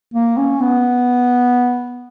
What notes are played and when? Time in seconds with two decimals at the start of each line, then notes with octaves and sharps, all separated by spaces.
0.14 A#3
0.37 C#4
0.60 B3